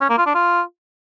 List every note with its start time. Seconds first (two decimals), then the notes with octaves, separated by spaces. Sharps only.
0.01 C#4
0.10 A#3
0.18 F4
0.26 D4
0.35 F4